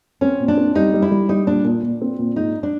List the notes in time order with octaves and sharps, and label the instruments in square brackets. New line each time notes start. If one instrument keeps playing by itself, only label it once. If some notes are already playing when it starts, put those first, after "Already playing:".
[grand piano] C4 [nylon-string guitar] C#4
[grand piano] A#2
[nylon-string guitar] D4
[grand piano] C4
[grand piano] G3 [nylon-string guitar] D#4
[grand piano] G3
[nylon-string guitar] E4
[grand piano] G3
[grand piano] G3 [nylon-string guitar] D#4
[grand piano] A#2 [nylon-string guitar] D4
[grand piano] A#2
A#2
C4
A#2
[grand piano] G#2 [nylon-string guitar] D#4
[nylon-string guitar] D4